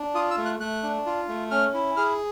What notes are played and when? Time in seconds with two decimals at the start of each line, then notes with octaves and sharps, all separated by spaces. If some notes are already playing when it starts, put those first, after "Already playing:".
Already playing: D4
0.14 F4 D#6
0.31 E6
0.38 A3
0.46 F#6
0.60 A3 F#6
0.83 D4
1.06 F4
1.29 A3
1.51 C#4 F6
1.74 E4
1.97 G#4 F6